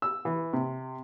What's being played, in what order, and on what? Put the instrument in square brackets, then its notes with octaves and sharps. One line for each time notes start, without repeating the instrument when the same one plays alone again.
[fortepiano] E6
E3
C3